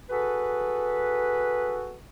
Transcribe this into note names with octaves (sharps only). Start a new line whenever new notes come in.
F#4 G#4 A4 B4